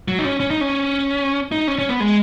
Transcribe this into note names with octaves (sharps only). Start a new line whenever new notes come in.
F#3
D#4
C#4
C#4
D#4
C#4
D#4
C#4
C#4
B3
G#3